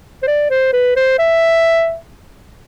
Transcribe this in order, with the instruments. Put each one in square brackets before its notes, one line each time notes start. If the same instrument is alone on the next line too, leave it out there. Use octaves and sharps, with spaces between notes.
[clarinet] C5
D5
C5
B4
C5
E5